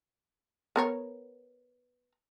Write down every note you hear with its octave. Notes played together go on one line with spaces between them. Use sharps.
B3 A#4 C#5